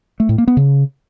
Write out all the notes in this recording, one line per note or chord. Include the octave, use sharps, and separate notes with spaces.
A3
A2
A#3
B3
C#3